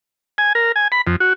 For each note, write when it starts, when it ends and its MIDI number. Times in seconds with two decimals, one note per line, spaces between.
0.38 0.53 80
0.55 0.72 70
0.76 0.88 80
0.92 1.01 83
1.07 1.16 41
1.20 1.33 66